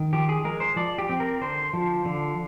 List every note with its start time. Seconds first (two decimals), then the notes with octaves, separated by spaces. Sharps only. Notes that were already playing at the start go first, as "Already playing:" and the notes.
Already playing: D#3
0.13 F3 G4
0.29 G#4
0.44 G#3 A#4
0.60 C5
0.76 F3 D5
0.98 G4
1.09 C4
1.20 A#4
1.41 D3 C5
1.73 F3
2.05 D3